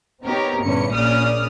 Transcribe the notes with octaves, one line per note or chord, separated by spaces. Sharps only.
B3 C4 D#4 G4 A#4 C#5
G1 E2 A#2 C#4 C#7
A#1 A#2 C#3 D5 D#6 F6